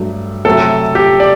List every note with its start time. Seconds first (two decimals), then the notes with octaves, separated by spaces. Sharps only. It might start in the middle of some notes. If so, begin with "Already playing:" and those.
Already playing: G2 F#3 A3
0.45 C3 F#3 A3 A4
0.95 G4
1.20 D5